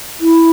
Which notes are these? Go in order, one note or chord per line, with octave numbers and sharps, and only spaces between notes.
E4